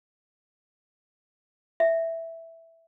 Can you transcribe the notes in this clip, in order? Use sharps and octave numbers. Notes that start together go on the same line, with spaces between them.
E5